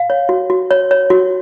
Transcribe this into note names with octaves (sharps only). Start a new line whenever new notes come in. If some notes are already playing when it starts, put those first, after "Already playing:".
Already playing: F5
C#5
F#4
F#4
C#5
C#5
F#4